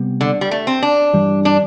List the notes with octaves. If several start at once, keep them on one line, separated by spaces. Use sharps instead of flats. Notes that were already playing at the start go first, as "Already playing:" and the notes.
Already playing: C3 G3 B3
D3
G3
A3
C4
D4
G2 E3 G3
D4